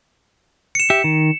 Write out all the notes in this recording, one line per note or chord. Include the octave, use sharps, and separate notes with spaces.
C#7 E7
G4 E5
D#3